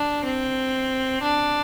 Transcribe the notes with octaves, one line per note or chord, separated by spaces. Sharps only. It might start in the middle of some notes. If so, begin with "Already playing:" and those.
Already playing: D4
C4
D4